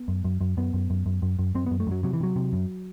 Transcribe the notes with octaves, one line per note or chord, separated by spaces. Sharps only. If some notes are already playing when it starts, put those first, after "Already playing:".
Already playing: B3
F#2
F#2
F#2
F#2 B3
F#2
F#2
F#2
F#2
F#2
F#2 C4
B3
F#2
A3
F#2 F#3
C3 F#3
E3
C3 F#3
C3
F#2